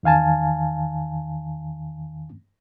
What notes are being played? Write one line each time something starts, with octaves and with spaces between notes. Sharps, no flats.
E2 D#3 F5 G#5 A5